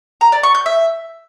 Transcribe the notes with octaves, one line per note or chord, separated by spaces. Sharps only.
A#5
D5
C#6
G6
E5